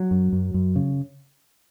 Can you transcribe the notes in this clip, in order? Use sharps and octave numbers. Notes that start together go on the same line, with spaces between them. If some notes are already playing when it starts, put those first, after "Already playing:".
Already playing: F#3
F#2
F#2
F#2
C#3